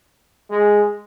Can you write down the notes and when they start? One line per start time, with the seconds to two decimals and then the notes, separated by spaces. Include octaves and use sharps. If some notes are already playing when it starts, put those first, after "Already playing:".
0.50 G#3